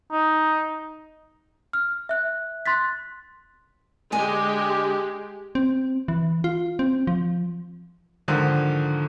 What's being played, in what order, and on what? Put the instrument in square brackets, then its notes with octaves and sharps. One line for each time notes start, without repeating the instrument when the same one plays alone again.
[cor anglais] D#4
[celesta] F6
E5 F#6
C6 F#6 A6 B6
[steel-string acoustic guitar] D3 G#5 [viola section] G#3 G4
[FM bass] C4
E3
F4
C4
F3
[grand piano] G#2 D3 D#3 F3